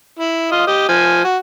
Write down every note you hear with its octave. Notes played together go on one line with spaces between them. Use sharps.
E4
F4 D#5
G4 D#5
F3 G#5
F#4